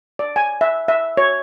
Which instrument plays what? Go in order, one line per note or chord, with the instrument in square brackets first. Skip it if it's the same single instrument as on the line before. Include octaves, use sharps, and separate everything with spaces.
[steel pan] D5
G#5
E5
E5
C#5